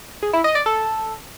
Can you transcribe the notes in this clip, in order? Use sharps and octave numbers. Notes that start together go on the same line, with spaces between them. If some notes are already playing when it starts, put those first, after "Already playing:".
G#4
E4
D#5
D5
A4